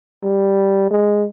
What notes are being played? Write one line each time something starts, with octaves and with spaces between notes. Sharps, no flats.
G3
G#3